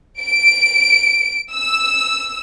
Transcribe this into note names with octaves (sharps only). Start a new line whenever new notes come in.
D7
E6